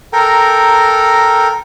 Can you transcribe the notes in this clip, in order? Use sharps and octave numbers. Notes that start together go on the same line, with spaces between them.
A4 A#4 G5 A#5